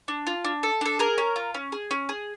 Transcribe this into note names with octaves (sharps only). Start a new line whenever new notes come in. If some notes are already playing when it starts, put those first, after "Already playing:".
D4
F4
D4
A4
D4 A4
G#4 A#4
C#4
F4
C#4
G#4
C#4
G#4